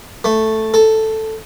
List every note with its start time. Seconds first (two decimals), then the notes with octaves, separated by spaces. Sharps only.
0.24 A3
0.74 A4